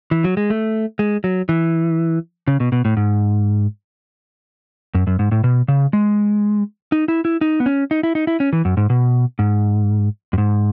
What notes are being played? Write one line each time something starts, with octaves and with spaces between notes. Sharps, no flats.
E3
F#3
G#3
A3
G#3
F#3
E3
C#3
B2
B2
A2
G#2
F#2
F#2
G#2
A2
B2
C#3
G#3
D#4
E4
E4
D#4
B3
C#4
D#4
E4
D#4
E4
C#4
E3
F#2
G#2
B2
G#2
F#2
G#2